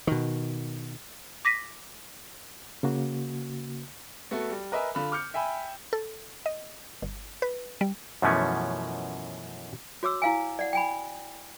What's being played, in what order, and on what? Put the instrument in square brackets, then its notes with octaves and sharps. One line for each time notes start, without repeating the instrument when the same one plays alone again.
[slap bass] B2 D#3
[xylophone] D6 A#6 B6 D#7
[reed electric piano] C#3 A#3 F#4
[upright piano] A3 B3 F#4 A4
G3
A#4 B4 D#5 E5 G#5
D3 F4 B5
D6 F6 G6 C#7
E5 G5 G#5 B5
[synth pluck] A4
D#5
G1
B4
G3
[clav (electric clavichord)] F#2 B2 E3 F3 A3 C#4
[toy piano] F#4 C#5 D6 E6
E4 F5 G#5
D5 F#5
G5 G#5 B5